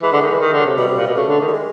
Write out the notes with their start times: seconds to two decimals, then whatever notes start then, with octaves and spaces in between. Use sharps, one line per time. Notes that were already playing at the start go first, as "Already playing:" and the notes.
0.02 E3 G#3
0.12 D3
0.22 D#3
0.31 E3
0.40 D#3 G#3
0.53 D3
0.59 F#3
0.65 C3
0.78 B2 G3
0.88 C3
0.97 A#2
1.07 B2 A#3
1.15 C#3 A3
1.28 D3
1.41 D#3
1.48 G3
1.53 G#3